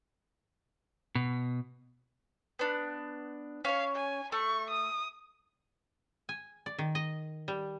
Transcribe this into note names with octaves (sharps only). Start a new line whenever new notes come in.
B2
B3 D4
C#4 C#5 F5
G#5
A3 C#6
D#6
G#5
D5
D#3
D#5
G3